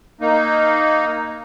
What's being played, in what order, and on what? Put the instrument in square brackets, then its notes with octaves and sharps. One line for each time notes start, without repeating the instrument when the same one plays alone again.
[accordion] A#3 D#4